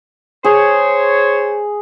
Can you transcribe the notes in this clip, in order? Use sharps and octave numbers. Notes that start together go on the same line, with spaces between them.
G#4 C5 C#5